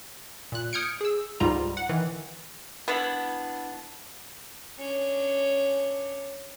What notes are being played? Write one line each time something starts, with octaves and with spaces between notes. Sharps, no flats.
A#2 F#6
D#6 F6 G6 G#6 C#7 D7
G#4 E6
C#2 G#2 G3 F4 A#5
F#5
D#3 E3
B3 D4 E4 B5
C#4 D4